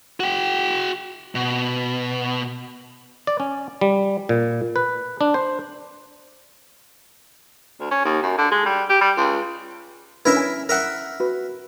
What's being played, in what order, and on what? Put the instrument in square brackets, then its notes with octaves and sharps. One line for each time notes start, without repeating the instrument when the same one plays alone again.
[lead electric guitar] F#4 G5
B2
[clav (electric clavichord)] D5
C#4
G3
A#2
B4
D4
C5
[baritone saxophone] D2
C#4
D#2
F#2
D3
G#3
G3
G4
G3
C#2
[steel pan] C#4 D4 B4 [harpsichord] E4 A#4 E5
[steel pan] G#5
[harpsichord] A#4 E5 F#5
[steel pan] F#4 B4